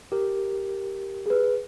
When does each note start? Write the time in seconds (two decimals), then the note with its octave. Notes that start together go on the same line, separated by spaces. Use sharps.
0.12 G4 A#4
1.26 G#4 B4